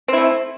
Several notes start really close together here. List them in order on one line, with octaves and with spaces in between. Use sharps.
C4 E4 A3